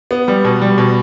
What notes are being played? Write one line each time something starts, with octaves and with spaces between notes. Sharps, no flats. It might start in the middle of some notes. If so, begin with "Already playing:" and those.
B3
G3
B2
G3
B2